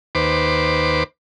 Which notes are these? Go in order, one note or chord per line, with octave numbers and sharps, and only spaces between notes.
D#2 B4 C5 D6